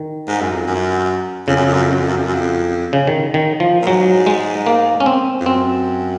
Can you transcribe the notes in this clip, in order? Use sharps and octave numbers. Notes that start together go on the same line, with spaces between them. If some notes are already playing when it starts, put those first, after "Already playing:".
Already playing: D#3
G#2
F#2
F2
F#2
F2 C#3
F#2
F2
F#2
F2
F#2
F2
F#2
F2
F#2
F2
C#3
D#3
D#3
F3
A#2
G#2 F#3
G#3
A#3
C#4
C4
F2
F#2 C4